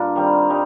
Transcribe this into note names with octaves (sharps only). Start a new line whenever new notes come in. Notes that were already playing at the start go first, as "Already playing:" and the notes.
Already playing: G2 A#3 D4 F4
D#3 G3 C4
G3 D#4